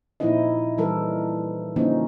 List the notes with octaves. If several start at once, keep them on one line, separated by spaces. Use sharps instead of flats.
A#2 F3 C4 D#4 E4 D#5
E3 G3 A4 A#4
D3 F3 A#3 C4 C#4 D#4